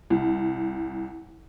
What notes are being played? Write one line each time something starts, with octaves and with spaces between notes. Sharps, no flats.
C2